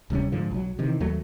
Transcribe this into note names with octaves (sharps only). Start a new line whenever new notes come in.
D1 C3 G3 C#4
G#2 D3 F3
B1 F#3
C3 D#3 E3
D#2 F#3 A3